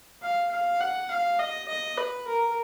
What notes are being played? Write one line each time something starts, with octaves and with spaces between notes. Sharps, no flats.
F5
F5
F#5
F5
D#5
D#5
B4
A#4